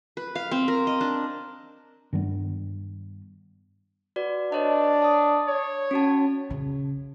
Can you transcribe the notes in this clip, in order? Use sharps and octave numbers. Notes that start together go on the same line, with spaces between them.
B4
F5
C4
A#4
D#5
D4
G2 D#3 G3 B3
F#4 B4 D5
D4 B4 C#5 D#5
A5 D#6
C#5
C#4 F#4 A5
C#3